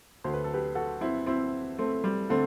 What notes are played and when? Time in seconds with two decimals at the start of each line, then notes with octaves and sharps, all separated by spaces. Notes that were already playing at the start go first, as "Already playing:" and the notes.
0.24 D2 D3 C5
0.34 B4
0.44 A4
0.53 G4 B4
0.75 F#4 A4
1.01 C4 E4
1.26 C4 E4
1.79 A3 C4
2.04 G3
2.30 D3 A3 C4